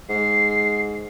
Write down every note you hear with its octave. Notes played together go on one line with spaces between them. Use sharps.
G#2 C7